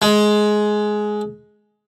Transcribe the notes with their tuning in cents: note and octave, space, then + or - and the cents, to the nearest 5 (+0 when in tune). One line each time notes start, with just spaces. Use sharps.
G#3 +15